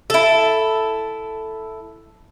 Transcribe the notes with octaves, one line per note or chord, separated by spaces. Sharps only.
E4 A4